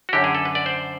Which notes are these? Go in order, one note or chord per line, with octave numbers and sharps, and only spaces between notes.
F#4
F#2 D3 G4
G#4
A4
B4
D5
C5